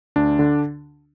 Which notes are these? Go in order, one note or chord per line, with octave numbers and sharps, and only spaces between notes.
D2 D4
D3